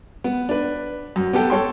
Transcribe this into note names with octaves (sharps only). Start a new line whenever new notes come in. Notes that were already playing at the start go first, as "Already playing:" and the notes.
B3
D4 B4
F#2
B3 G4 A4 G5
A4 C#5 G5 C6